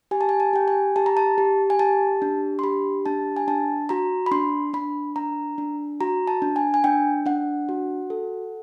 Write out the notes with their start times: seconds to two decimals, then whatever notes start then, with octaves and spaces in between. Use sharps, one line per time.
0.11 G4 G#5
0.21 A5
0.29 G#5
0.40 A5
0.53 G4 G5
0.68 G#5
0.96 G4 A5
1.06 A#5
1.17 A5
1.38 G4
1.70 G#5
1.79 G4 A5
2.22 D4
2.59 C6
2.63 G4 B5
3.06 D4 A5
3.37 G#5
3.48 D4 A5
3.89 F#4 A#5
4.26 B5
4.32 D4 C6
4.73 D4 B5
5.16 D4 A#5
5.58 D4
6.00 F#4 A#5
6.28 A5
6.42 D4
6.56 G#5
6.74 G#5
6.84 D4 G5
7.26 D4 F#5
7.69 F#4
8.10 A4